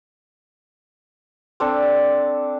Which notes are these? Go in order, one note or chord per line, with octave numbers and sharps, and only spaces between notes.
C4 D4 A4